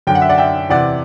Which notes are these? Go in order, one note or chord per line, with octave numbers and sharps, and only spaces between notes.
F#2 D3 G5
F#5
E5
D5 F#5
E5 G5
E2 C3 E3 D5 F#5